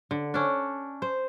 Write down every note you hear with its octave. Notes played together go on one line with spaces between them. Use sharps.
D3
C#4 D4
C5